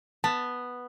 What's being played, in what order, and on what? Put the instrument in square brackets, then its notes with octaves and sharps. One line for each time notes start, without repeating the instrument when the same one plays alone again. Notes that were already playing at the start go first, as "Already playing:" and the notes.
[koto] B3 [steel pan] A5